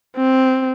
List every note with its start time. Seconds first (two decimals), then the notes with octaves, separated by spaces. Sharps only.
0.17 C4